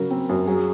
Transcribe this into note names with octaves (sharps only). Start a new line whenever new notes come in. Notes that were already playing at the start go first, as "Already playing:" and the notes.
Already playing: C#3 F#3 A#4
C4
F#2
F#3 G#4